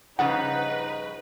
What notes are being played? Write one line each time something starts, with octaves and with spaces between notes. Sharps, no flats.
G2 C#3 F3 D#4 B4 F#5